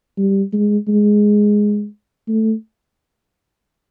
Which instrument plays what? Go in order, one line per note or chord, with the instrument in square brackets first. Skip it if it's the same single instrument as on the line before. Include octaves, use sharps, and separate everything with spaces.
[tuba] G3
G#3
G#3
A3